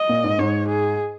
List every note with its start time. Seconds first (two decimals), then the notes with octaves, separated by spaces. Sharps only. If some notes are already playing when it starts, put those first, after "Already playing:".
Already playing: D#5
0.09 A#2
0.24 G#2
0.39 G#2 C#5
0.68 G#4